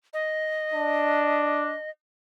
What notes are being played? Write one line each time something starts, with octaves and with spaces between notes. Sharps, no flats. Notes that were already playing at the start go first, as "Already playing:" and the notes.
D#5
D4